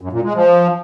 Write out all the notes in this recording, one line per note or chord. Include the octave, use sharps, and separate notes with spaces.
F#2
A#2
G#3
F3